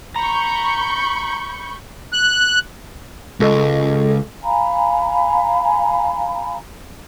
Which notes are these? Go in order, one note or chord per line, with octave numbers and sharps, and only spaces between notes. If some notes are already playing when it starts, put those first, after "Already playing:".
A#5 B5 C#6 G6
F#6
C#2 G#3 A4 D#5
F5 G#5 A#5 B5